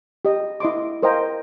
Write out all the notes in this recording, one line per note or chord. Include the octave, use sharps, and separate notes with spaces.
G4 D#5
E4 D#5 C6 D6
A#4 C5 D#5 F5 G5 A#5